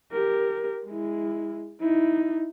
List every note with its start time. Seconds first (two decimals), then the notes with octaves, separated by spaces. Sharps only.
0.12 G4 A#4
0.87 G#3 E4
1.81 D#4 E4